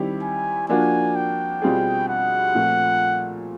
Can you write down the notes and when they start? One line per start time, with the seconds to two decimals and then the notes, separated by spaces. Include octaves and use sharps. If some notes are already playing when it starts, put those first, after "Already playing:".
Already playing: D#3 G3 C4 E4 G4
0.22 G#5
0.69 F3 A#3 D4 F#4 G#5
1.16 G5
1.62 B2 G3 C4 F4 G#4
2.09 F#5
2.55 A#2 F3 A3 C4